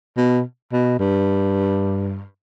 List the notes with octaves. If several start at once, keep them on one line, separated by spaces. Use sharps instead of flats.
B2
B2
G2